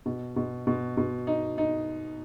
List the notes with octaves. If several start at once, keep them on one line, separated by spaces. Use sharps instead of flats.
B2
B2
B2
B2
D#4
D#4